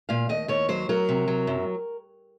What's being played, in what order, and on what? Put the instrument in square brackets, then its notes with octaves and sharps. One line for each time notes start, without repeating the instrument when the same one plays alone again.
[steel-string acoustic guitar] A#2 F5
D#2 D#5
D#2 C#5
F#3 C5
F#3 A#4
C3
F#3
F#2